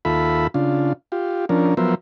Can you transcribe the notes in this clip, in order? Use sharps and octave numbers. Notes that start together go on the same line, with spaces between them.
D#2 F4 A4 E5 B5
C#3 D4 F4
F4 G4
F3 C#4 D4 A#4
F3 F#3 B3 A#4 C5 E5